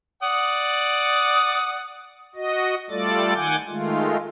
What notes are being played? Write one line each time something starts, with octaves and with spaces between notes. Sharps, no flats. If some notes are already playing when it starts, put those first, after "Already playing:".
D5 F#5 D#6
F#4 D#5
G3 A3 F4 A4 D5 A6
D#3 F#5 G#5 D6 G6
D#3 G#3 A3 F4